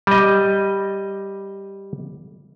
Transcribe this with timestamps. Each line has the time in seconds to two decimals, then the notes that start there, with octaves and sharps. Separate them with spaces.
0.07 G3 D#5